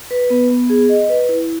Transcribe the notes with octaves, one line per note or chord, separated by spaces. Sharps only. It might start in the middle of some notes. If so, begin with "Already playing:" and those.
B4
B3
B3
G#4
D#5
B4
E4